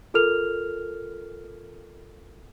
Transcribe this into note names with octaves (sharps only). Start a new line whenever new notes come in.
F4 A4 A#4 F6 F7